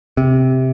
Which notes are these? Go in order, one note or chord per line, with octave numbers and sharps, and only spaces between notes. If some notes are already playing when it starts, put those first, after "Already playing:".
C3